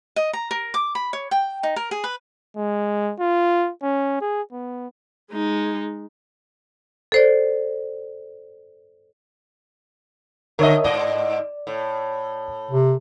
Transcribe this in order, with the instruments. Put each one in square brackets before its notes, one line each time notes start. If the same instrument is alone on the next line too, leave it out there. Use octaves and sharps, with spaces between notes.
[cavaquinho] D#5
A#5
A#4
D6
B5
C#5
G5
D#4
A#4
G#4
B4
[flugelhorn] G#3
F4
C#4
G#4
B3
[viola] G#3 D#4
[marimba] A4 C5 D5
[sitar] D3 D#5 [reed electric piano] A#4 C#5 E5
[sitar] G#2 D#5 [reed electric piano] D5
[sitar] A2
[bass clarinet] C3